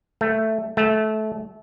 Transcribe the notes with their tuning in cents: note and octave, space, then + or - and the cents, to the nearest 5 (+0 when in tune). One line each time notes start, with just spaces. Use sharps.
A3 +5
A3 -20